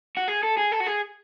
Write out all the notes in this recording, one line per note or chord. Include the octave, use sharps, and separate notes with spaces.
F#4
G#4
A4
G#4
A4
F#4
G#4